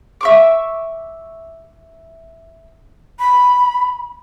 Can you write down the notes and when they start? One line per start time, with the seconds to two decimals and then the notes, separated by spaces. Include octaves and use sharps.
0.21 E5 C#6 D6
3.19 B5